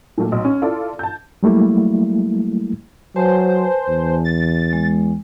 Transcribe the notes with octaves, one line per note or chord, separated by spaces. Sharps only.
A#2 F#3 A3 A#3
B1
C#4
E4 F4 A4 D5
A5 G6
F#3 G3 A3 A#3 E4
F#3 B4 C5 G#5 A5
E2
A6
G#3